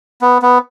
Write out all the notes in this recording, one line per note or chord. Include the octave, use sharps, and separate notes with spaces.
B3
B3